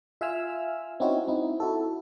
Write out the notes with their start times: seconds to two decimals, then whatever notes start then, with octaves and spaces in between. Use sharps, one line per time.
0.21 F4 E5 F5 G#5 E6 F6
1.00 C4 C#4 D#4 E4 F#4 C#5
1.27 C4 D#4 E4
1.60 E4 F#4 A4